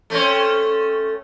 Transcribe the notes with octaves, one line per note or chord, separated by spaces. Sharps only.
A3 C4 C#4